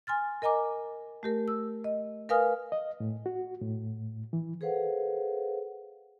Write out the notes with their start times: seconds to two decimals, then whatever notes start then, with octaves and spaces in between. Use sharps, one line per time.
0.07 G#5 C6 F6 A6
0.42 A#4 D#5 G#5 A#5 D6
1.23 A3 G4 A#4
1.48 E6
1.84 D#5
2.29 A#4 B4 F5 G#5 D#6 F6
2.72 D#5
3.00 A2
3.26 F#4
3.62 A2
4.33 E3
4.61 G#4 A4 B4 C5 F5 F#5